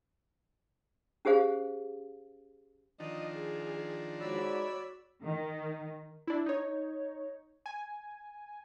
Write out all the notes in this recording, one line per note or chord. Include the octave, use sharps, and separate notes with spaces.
C#4 G4 G#4 C5 F5
D#3 F3 D4 D#5
G#4
G#2 F#4 C#5 D5 B5 E6
D#3
D4 E4
D#4 C#5
G#5